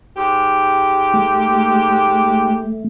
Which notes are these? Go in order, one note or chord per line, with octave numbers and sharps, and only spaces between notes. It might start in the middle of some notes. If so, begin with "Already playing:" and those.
G#2 G4
A3